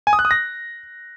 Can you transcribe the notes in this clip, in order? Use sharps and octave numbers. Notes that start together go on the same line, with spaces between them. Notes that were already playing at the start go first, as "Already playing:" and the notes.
G#5
D#6
F#6
D#6
A#6